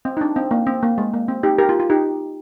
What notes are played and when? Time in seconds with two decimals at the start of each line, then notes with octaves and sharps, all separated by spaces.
0.05 C4
0.17 D#4
0.21 D4
0.36 C4
0.51 A#3
0.67 C4
0.83 A#3
0.98 G#3
1.14 A#3
1.28 C4
1.43 D#4 G4
1.59 G4 A#4
1.69 F4
1.80 F4
1.90 D#4 G4